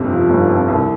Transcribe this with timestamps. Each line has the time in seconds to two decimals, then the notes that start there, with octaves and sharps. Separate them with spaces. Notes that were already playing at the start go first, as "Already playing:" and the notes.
Already playing: G1 F2 C3
0.10 F3
0.30 G1
0.48 F2
0.68 C2